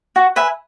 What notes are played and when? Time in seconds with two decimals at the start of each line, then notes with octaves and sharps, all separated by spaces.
0.16 F#4
0.36 B4 E5 G#5